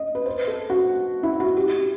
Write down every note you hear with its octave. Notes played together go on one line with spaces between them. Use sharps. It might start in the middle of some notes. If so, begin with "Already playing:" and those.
Already playing: D#5
B4
C5
A4
F#4
E4
F#4
G4